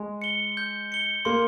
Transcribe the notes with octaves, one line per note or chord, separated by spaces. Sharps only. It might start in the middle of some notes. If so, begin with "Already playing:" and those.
Already playing: G#3
C#7 G7
G6
C#7 G7
A#3 C6